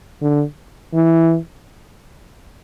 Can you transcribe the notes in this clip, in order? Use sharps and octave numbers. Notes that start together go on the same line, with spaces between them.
D3
E3